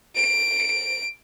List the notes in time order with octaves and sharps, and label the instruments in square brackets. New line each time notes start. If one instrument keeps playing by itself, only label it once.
[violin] D7